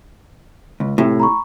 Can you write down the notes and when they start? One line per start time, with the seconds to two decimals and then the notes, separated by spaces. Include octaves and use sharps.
0.80 C#2
0.98 A2 C3
1.20 A#5 B5 C#6